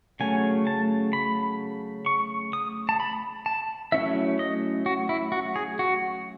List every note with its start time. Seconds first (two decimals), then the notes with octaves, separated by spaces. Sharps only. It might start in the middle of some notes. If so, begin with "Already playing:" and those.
0.20 C#3 F#3 A3 C#4 G#5
0.67 A5
1.13 B5
2.06 C#6
2.53 D#6
2.89 A5
3.00 B5
3.46 A5
3.92 F#3 A3 C#4 E4 E5
4.39 D#5
4.86 F#4
5.09 E4
5.32 F#4
5.56 G#4
5.79 F#4